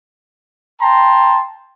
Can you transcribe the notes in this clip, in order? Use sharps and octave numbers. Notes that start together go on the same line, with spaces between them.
G5 A5 A#5 C6